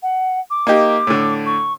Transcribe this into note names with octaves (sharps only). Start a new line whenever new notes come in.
F#5
D6
A#3 D#4 G4
A2 D3
C#6